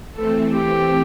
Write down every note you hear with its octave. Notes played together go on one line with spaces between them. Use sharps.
E3 A3 C4 A4
G4